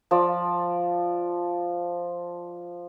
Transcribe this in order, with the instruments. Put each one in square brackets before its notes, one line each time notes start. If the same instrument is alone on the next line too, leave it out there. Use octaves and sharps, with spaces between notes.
[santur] F3 D5